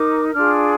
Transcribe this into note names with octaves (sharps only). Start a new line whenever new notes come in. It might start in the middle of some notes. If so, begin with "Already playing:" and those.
Already playing: D#4 A#4 D6
D4 F4 G#4 F6